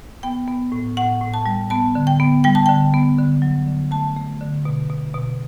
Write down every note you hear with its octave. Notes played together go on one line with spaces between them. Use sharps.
B3 G5
B3
A2
A2 F#5
A2
A5
G3
B3 A5
D3
G5
B3
G3 G5
A5
D3 G5
B3
D3
F#3
D3
A3 A5
A3
D3
B2
B2
B2